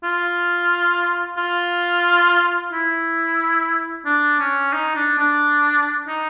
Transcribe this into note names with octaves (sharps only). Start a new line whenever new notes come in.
F4
F4
E4
D4
C#4
D#4
D4
D4
D#4